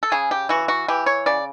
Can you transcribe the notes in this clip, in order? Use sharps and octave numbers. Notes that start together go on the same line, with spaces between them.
A4
C#3 G#4
G4
E3 F#4
F#4
E3 G4
C#5
C#3 D5